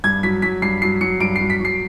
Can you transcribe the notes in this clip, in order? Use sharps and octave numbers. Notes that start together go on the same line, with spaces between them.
G2 G#6
F#3 B6
F#3 B6
G2 C7
F#3 C7
F#3 C#7
G2 D7
C7
F#3
B6
F#3 C7